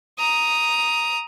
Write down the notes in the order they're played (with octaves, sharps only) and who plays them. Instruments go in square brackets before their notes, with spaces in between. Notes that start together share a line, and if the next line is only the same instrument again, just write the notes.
[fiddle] A#5 D#6